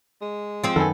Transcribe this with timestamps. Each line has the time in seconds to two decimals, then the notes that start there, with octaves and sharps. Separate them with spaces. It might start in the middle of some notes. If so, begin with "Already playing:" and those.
0.22 G#3
0.64 F3 C4
0.76 F#2 D#3 B3 A4 G#5